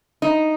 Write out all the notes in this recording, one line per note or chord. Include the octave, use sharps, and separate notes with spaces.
D#4